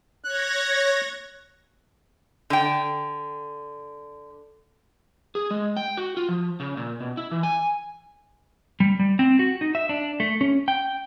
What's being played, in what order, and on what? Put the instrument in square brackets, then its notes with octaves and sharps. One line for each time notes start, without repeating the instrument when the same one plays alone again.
[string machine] C#5 G#6 A#6 [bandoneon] F#6
[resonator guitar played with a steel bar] D3 G5
[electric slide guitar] G#4
G#3
G5
F#4
F4
F3
C#3
A#2
B2
E4
E3
G#5
G3
G3
C4
F#4
D#4
E5
D4
A3
C#4
G5